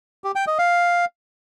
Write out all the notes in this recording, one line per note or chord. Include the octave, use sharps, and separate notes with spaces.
G4
G5
D#5
F5